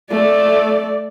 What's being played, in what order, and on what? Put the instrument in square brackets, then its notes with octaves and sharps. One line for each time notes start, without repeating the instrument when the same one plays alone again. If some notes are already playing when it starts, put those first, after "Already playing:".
[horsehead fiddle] A3 D5